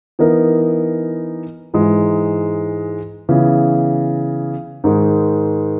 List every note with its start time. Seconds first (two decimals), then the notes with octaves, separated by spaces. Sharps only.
0.19 E3 B3 D#4 A#4
1.74 G#2 E3 G#3
3.29 C#3 E3 B3
4.84 G#2 D#3 G#3